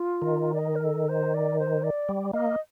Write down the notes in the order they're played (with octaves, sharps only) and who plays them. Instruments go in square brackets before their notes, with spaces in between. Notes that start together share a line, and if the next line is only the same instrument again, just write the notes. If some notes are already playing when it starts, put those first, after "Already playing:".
Already playing: [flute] F4
[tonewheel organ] D#3
[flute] D5
D#5
A#4
A4
C5
D5
C5
D5
[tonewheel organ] G3
[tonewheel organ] A#3 [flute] D#5